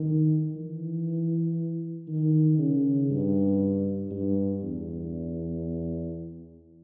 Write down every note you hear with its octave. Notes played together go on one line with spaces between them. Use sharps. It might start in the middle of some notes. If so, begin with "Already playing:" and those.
Already playing: D#3
E3
D#3
C#3
G2
G2
E2